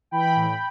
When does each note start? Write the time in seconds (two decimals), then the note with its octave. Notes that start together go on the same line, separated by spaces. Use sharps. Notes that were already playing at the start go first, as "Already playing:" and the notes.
0.11 E3 G5 B5
0.36 A2